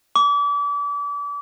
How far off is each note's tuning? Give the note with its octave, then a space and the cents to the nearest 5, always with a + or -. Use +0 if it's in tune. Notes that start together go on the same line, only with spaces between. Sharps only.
D6 -35